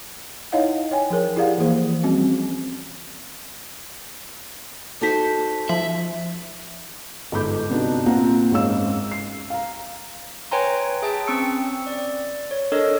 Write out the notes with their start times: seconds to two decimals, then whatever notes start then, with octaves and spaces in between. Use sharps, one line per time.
0.52 D#4 E4 C#5 D#5 F5 F#5
0.91 C#5 G5 G#5
1.10 F3 G#4 A#4 C#5
1.36 E4 G4 G#4 D5 F5 F#5
1.58 E3 F3 A#3 G#4 C5
2.03 G3 C4 C#4 F#4
5.01 D#4 F#4 A4 C5 A5 B6
5.69 F3 E5 B5
7.32 G1 G#2 A4 B5 D6 G6
7.70 C3 B3 D4 D#4 F#4
8.06 A#2 C4 F4 F#5 A#5
8.51 F#1 G#2 G#3 C#4 F5 E6
9.12 C7
9.50 F5 A#5
10.51 B4 C#5 G5 G#5 A#5 C6
11.02 G#4 E5 G5 A5
11.27 C4 C#4 C#6 E6 C#7
11.87 D5
12.51 C#5
12.72 D4 A4 A#4 C#5 D#5